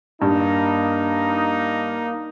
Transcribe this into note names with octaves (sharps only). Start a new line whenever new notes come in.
G2 A#3 D#4